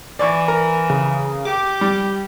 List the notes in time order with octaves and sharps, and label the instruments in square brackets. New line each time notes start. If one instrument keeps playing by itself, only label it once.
[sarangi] E3 [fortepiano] D5 C#6
[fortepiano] A#4
[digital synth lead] C#3
[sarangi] G4 [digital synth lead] D6
[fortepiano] G3